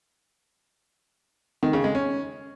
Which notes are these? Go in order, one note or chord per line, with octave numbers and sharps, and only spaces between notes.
D#3
C#3
G#3
C#4